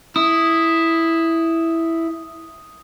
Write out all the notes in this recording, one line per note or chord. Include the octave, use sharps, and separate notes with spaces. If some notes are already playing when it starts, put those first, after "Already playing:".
E4 D#6